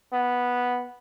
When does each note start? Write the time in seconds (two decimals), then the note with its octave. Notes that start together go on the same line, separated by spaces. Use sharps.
0.13 B3